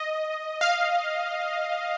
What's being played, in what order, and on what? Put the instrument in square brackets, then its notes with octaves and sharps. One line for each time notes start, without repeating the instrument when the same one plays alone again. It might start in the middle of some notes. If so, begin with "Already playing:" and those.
Already playing: [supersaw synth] D#5
F5